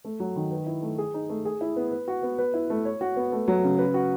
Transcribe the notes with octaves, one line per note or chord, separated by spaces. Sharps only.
A3
F#3
D#3
B4
E4
A3
G#4
D#4
A3
G#4
E4
B3
B4
F#4
B3
B4
E4
A3
C#5
F#4
B3
A3
F#3
C#3
B4
F#4